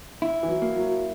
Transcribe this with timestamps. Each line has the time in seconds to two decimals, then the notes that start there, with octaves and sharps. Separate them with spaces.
0.22 E4
0.43 E3
0.48 F#3
0.62 A#3
0.76 F#3